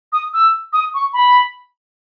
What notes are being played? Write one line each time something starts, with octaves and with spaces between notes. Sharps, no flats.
D#6
E6
D#6
C#6
B5